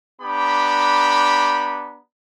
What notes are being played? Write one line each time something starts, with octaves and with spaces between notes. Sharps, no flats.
B3 D4 G4 A#5 B5